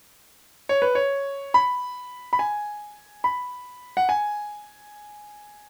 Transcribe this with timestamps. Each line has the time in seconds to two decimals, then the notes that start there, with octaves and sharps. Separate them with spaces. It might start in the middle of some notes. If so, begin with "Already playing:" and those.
0.69 C#5
0.82 B4
0.95 C#5
1.54 B5
2.33 B5
2.39 G#5
3.24 B5
3.97 F#5
4.09 G#5